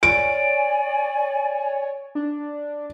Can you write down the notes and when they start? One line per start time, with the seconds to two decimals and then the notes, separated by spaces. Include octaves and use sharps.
0.03 C#5 D5 G#5 D7
2.15 D4